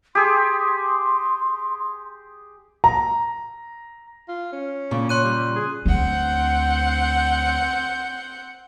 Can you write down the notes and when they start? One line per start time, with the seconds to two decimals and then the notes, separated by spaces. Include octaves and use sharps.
0.15 G4 G#4 C6
2.84 A#5
4.28 F4
4.53 C#4
4.91 A#2 C#3
5.09 C#5 C6 F#6 D#7
5.24 G3
5.56 G#4
5.86 D2 C4 F#5 G6